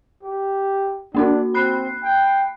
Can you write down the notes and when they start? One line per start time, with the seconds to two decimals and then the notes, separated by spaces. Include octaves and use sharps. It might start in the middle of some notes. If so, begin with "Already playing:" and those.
0.23 G4
1.15 A#3 D4 D#4 F#4
1.54 C4 B5 F#6 C7
2.03 G5